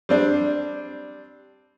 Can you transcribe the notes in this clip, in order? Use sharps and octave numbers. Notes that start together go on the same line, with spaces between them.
G3 C4 D4